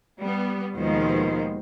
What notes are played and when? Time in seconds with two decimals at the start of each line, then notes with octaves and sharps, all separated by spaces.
0.18 G3 B3
0.74 D#2 B2 D#3 F3 G#3 C5